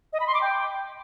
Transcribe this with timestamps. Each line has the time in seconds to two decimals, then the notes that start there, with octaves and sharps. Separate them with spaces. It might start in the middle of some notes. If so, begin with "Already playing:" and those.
0.13 D#5
0.20 B5
0.27 C6
0.34 D6
0.41 G5